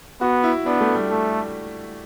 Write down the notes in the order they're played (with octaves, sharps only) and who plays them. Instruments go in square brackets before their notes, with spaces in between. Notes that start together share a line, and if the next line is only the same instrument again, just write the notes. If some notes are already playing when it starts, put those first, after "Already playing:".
[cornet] B3 [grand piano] F#4
[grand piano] E4
[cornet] B3 [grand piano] D4
[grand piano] A3
G3
[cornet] A3